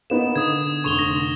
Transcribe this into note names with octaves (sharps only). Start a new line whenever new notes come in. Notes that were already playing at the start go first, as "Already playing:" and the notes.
A#3 B3 D#4 E7
D3 D#6 G#6
F1 D3 C6 C#6 F7 G7
A#6